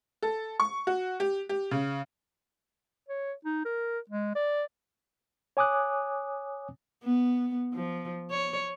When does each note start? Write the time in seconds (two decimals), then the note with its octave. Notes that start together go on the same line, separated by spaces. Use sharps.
0.23 A4
0.60 C#6
0.87 F#4
1.20 G4
1.49 G4
1.71 C#3
3.09 C#5
3.45 D#4
3.65 A#4
4.10 G#3
4.35 D5
5.57 C#5 G#5 D6 D#6 F#6
7.04 B3
7.73 F3
8.30 C#5